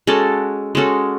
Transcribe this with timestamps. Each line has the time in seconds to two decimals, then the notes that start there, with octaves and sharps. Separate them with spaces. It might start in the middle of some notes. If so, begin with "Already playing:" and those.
0.07 G#3 C#4 F#4 A4
0.75 G#3 C#4 F#4 A4